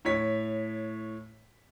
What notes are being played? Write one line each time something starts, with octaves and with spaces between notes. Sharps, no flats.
A2 C#5 B6